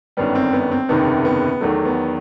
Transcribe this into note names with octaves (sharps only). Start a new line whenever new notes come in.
G1 F#2 D#3 G3 B3
C4
B3
C4
F#1 E2 C3 D#3 B3
B3
E2 D#3 F#3 A3
B3